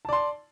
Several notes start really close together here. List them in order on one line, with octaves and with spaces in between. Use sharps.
A5 D5 C6